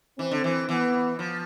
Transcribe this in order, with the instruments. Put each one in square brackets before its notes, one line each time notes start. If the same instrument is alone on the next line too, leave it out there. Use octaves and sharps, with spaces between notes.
[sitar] E3 [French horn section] C4
[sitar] D3
E3
[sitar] E3 [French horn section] B3
[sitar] F3